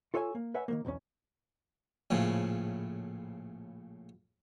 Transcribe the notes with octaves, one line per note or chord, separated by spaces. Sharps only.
F4 A4 C#5 E5 G5 G#5
A#3
B4 C#5 E5 F#5 G#5
D#3 F#3 A#3
B1 E2 C4 C#4
A#1 A2 C#3 F3